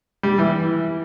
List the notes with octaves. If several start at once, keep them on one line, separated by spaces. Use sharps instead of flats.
G3
E3